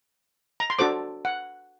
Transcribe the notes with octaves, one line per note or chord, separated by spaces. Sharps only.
A#5
C6
D4 F#4 A4 C5 D6
F#5